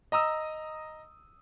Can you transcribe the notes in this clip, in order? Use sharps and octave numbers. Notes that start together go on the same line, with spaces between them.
D#5 A#5 D#6 E6